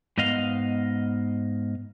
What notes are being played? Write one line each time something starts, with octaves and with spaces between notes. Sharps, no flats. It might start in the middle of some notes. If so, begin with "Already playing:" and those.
G#2 B3 D#5 F5